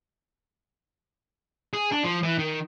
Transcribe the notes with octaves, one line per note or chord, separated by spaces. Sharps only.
G#4
D4
F3
E3
D#3